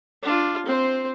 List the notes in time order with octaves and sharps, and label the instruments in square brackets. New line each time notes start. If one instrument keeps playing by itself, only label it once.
[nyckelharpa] D4 F4
C4 C5